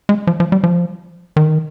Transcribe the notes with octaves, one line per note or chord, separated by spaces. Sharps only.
G#3
F3
F3
G3
F3
D#3